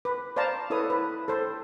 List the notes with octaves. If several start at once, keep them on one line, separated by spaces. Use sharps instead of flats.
B4
C5 D5 F5 A5 A#5
E4 A4 B4 C#5 D#6
B4
A4 C5